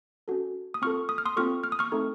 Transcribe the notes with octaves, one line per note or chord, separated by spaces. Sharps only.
C#4 F#4 A4
D#6
C4 F4 A4 C#6 F6
D#6
F6
C6 D#6
C4 F4 A4 C#6 F6
F6
D#6
C#6 F6
A3 C4 D#4 A4